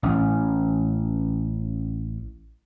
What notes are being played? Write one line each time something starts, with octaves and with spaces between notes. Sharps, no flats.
A1 C#4